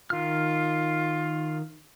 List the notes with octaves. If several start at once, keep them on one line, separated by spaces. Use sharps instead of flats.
D#3 F4 F6